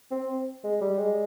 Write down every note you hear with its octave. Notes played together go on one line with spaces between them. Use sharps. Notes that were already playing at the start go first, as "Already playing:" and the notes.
C4
G#3
G3
G#3